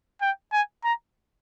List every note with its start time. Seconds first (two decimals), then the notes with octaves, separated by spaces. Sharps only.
0.22 G5
0.52 G#5
0.84 A#5